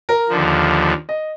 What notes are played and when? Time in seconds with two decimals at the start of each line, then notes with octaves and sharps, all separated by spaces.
0.09 A#4
0.29 D#2 D3 F3
1.09 D#5